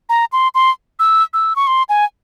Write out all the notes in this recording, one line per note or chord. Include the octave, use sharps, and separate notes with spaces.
A#5
C6
C6
E6
E6
C#6
C6
G#5